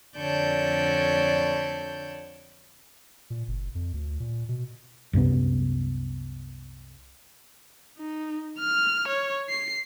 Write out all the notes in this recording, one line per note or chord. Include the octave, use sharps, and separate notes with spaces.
F2 D3 C#5 D5 A5 G6
A#2
F#1
F2
D2
A#2
B2
C2 F#2 C3 B3
D#4
F6
C#5
C7